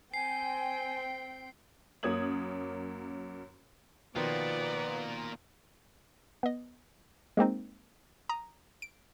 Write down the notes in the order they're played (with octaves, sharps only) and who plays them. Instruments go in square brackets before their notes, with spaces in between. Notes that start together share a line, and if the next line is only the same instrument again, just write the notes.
[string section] C4 G5 [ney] G#5 [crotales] C7
[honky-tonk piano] F#2 A#3 C#4 D#6 G#6 F#7
[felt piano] B2 D#3 F3 [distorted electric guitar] A#3 F4 [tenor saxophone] B3 [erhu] D5
[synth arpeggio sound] B3 D#5
G#3 A#3 C4 D#4
A#5 D#6
D7